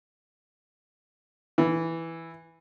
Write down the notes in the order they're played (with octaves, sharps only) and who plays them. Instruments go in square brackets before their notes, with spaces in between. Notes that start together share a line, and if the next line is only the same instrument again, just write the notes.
[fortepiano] E3